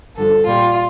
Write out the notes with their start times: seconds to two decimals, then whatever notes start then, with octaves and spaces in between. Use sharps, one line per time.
0.17 G2 D3 F3 A4
0.46 A#2 G3 F4